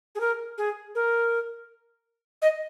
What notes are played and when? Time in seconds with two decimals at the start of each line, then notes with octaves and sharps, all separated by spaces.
0.15 G#4
0.20 A#4
0.58 G#4
0.95 A#4
2.42 D#5